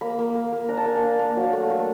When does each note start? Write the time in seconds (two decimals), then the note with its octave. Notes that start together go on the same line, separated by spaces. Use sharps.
0.01 A#3 B5
0.19 A#3
0.35 A#3
0.53 A#3
0.69 D4 A#5
0.77 A5
0.86 A#3 G#5
0.95 A5
1.03 D4
1.19 A#3
1.36 F#3
1.53 A3
1.70 A3